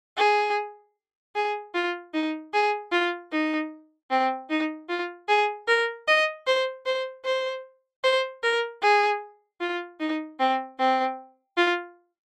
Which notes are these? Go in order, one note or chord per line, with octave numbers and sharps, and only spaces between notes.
G#4
G#4
F4
D#4
G#4
F4
D#4
C4
D#4
F4
G#4
A#4
D#5
C5
C5
C5
C5
A#4
G#4
F4
D#4
C4
C4
F4